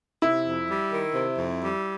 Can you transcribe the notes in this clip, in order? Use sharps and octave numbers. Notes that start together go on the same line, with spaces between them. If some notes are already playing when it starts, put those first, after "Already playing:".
C3 E4
F2
G3
D#3
C3
F2
G3